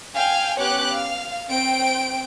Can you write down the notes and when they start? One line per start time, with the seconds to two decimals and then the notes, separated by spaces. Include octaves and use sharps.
0.14 F5 G5 G#5
0.58 B3 C#4 G4 C#5 D6 F#6
0.92 F5
1.49 C4 G5 D7